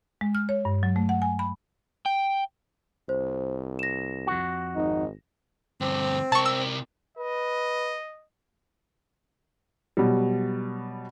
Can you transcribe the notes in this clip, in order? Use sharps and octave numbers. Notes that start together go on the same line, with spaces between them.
G#3
F6
C#5
G2
F#3
A3
F#5
G#5
B5
G5
C2 C5
A#6 E7
F2 F#4
G#1 D#4
D2 G2 C4
C3 A#4 A5 C#6
E6
B4 D#5
B2 F#3 G3